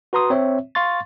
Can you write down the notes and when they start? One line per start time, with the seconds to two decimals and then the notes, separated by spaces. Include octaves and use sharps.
0.13 F#4 B4 A#5 C6 D#6
0.30 C4 C#5 E5
0.75 F5 C6 C#6 A6